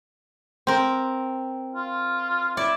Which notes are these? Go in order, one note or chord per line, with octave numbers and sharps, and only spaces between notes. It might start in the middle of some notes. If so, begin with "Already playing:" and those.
C4 A#4
F4
E4 D5